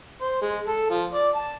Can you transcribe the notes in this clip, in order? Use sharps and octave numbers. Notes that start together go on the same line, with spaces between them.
C5
G#3
A4
F3
D5
A5